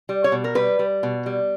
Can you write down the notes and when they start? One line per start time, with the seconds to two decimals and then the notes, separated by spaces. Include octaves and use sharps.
0.09 G3
0.24 C#5
0.32 B2
0.44 A#4
0.55 G3 B4
0.79 G3
1.03 B2
1.26 G3